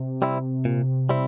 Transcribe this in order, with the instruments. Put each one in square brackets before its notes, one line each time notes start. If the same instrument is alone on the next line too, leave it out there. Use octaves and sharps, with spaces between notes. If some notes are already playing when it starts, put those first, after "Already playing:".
Already playing: [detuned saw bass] C3
[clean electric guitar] G3 C4 E4
A#2
G3 C4 E4